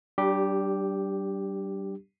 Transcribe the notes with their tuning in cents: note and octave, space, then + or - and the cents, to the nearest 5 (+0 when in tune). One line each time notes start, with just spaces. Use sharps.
G3 -30 D4 +0 G4 +0